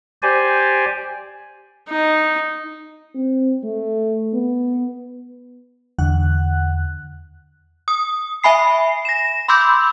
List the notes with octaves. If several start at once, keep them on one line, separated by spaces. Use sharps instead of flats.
G4 C5 D5 G#5
D#4
C4
A3
B3
E2 D3 F#5 F#6
D#6
E5 G#5 B5 C7
A#6 E7
B5 C6 D6 E6 G6